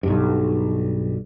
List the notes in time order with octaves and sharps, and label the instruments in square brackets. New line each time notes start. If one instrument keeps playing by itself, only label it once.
[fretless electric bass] B1 G2